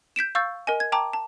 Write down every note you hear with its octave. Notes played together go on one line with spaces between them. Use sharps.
G6 B6 D7 E7
F5 C#6 E6 G6 A6
A#4 D#5 G#5
G#6
G5 A5 A#5 D6
A5